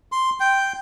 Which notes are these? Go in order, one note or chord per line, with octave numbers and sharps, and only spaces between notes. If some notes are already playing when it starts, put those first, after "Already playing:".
C6
G5